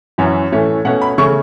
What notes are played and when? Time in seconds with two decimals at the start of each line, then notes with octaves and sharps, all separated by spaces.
0.18 F#2 E3 C#4
0.52 A2 E3 A3 C#4
0.85 B2 A3 C#4 F#5
1.02 B5
1.18 C#3 A3 C#4 C#6